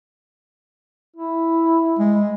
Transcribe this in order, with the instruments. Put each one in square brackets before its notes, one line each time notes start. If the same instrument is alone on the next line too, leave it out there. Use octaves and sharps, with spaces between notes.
[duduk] E4
[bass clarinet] G#3